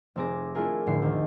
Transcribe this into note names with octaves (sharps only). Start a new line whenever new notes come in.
F1 C3 C4 G#4 D6 A#6
A3 D4 E4 F4 G#4 A#4
F1 A2 D3 E4 C7
D2 D#3